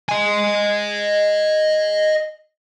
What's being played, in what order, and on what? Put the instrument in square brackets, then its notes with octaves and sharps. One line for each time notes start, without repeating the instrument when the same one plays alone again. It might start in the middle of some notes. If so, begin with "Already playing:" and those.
[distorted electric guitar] D#5 G#5